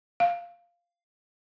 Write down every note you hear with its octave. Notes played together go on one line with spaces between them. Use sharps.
F5